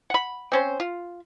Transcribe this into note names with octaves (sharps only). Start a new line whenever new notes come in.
F#5 B5
C4 C#4 C5
F4